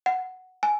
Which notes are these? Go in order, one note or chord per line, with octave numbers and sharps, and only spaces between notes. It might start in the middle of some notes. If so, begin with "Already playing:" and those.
F#5
G#5